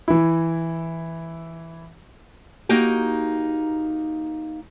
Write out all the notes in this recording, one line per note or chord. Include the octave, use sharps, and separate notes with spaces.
E3 E4
A#3 D#4 F#4 G4